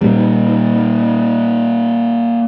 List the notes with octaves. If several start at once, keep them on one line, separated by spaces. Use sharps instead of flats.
A#2 G3